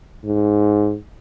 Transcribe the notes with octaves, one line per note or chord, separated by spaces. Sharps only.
G#2